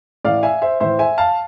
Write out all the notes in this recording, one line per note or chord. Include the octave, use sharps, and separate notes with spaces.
A2 E3 D5 F5
E5 G#5
C5 E5
A2 E3 C5 E5
E5 G#5
F5 A5